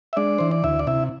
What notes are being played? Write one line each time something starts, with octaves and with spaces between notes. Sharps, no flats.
E5
G#3 D4 D5
E3 C5
D5
D2 E4 E5
D5
C3 E4 E5